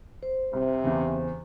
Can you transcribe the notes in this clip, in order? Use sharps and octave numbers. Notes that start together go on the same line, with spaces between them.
C5
C2 C3
E2 C#3 E3